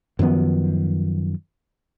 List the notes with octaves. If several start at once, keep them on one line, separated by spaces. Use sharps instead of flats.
F#2 D#3 F3 B3